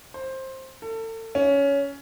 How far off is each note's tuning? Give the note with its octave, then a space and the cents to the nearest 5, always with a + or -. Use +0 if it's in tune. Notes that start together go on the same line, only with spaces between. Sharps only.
C5 +15
A4 +35
C#4 +15